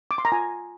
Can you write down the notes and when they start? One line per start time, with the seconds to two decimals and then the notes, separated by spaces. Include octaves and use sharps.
0.11 D6
0.18 C6
0.25 A#5
0.32 F4 G#5